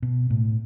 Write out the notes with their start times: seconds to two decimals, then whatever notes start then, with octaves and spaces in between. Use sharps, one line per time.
0.02 B2
0.30 A2